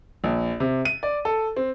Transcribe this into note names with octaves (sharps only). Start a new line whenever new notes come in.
A#1
C3
D#7
D5
A4
C4